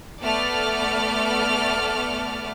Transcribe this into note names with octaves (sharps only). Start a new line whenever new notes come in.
A3 B3 A4 D5 F6